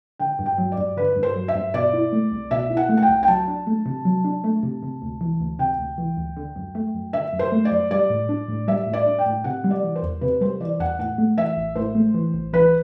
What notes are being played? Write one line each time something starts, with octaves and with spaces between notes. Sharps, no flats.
D3 G5
G2
G5
F#3
D5
G2
D3 B4
G2
C5
F#3
E5
G2
B2 D5
E4
A3
C2
B2 E5
E4
F#5
A3
F#5
G5
C2
G5
F#3 A5
D4
A3
C3
F#3
D4
A3
C3
C3
D2
E3
D2
C3 G5
D2
E3
D2
D3
F#2
A3
F#2
D3 E5
F#2
C5
A3
D5
F#2
G3 D5
A2
D4
A2
G3 E5
A2
D5
D4
G5
A2
C3 F#5
G3
D5
E3
C5
E2
C3 B4
G3 C5
E3 D5
E2 F#5
A2 F#5
A3
E3 E5
A1
A2 C5
A3
E3
A1
E3 B4